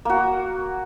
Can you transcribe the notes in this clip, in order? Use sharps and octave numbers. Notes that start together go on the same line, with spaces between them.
A#3 F#4